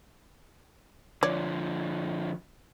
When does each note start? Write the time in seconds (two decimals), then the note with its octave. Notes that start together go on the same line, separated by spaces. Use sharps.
1.23 D3 F3 C#5 D5